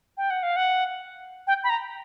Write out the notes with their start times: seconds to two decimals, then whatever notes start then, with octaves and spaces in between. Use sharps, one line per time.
0.17 G5
0.30 F#5
0.43 F5
0.56 F#5
1.47 G5
1.64 B5
1.70 A#5